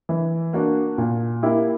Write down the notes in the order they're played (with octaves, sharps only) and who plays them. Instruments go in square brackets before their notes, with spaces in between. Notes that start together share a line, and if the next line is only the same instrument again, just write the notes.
[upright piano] E3
A#3 D4 F#4
A#2
A#3 E4 G4